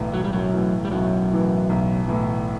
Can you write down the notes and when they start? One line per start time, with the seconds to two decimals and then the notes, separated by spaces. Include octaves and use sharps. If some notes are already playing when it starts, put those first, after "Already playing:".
Already playing: B1 A2 E3
0.14 B1 F#3
0.24 G3
0.33 F#2 F#3
0.53 A2 E3
0.85 G3
0.91 B1 F#2 F#3
1.31 A2 E3
1.69 B1
2.08 A2 E3